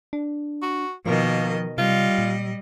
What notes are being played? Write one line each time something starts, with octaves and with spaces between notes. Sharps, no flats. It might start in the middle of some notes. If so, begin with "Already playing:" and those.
D4
F#4
B2 D#3 F3 A#3 D#5
C3 G3 F4 D#5
A#2